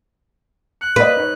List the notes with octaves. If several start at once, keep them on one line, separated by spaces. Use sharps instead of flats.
F#6 C#7
A#3 B4 D5 D#5
D#4 C#5